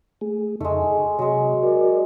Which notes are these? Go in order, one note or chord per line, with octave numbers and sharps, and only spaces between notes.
A3 G#4
F2 C#3 G#3 A3 D#4
G#4
C3 F#3 G#3
F#4 A#4 D5